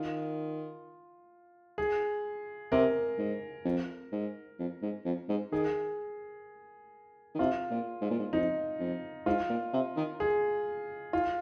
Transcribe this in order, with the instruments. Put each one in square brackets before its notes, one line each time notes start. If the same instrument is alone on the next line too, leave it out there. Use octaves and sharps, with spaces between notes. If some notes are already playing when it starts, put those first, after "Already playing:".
Already playing: [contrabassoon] D#3 [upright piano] F4
[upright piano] G#4
[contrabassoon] C3 [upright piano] A#4
[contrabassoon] G#2
F2
G#2
F2
G#2
F2
G#2
[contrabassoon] D#3 [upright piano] G#4
[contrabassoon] D#3
[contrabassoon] C3 [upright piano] F4
[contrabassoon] A#2
G#2
A#2
G#2
[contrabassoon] F2 [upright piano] D#4
[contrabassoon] F2
[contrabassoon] G#2 [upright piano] F4
[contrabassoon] A#2
C3
D#3
[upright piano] G#4
F4